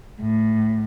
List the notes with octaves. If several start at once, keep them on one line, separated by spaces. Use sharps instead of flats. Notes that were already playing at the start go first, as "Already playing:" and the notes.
A2